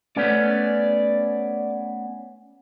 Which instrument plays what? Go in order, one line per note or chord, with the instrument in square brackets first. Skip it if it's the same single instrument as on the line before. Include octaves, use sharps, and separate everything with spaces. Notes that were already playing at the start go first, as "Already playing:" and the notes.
[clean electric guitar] A3 B3 C#4 [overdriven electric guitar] D5